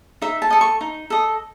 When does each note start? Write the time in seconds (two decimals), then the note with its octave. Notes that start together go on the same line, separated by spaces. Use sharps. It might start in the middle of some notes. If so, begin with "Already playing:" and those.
0.22 D#4 E5
0.42 A5
0.50 A4 D#5
0.61 C#6
0.81 D#4
1.10 A4 D#5